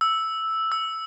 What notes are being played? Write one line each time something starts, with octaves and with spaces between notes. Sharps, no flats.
E6
E6